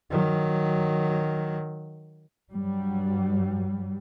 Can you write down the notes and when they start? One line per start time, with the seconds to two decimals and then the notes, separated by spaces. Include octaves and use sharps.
0.10 D#3 F#3
2.52 G2 F#3 G3